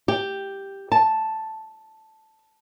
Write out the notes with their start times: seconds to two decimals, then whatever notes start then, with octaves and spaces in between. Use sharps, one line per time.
0.08 G4
0.92 A5